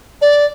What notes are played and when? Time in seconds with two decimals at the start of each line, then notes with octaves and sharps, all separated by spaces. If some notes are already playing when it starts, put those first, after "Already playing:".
0.22 D5